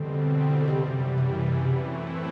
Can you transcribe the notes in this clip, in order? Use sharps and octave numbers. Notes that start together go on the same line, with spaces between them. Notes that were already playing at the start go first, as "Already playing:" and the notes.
Already playing: E2 B2 D3 G3 C4
F#2 C3 E3 G3
C3
A2 E3 A3 C4 E4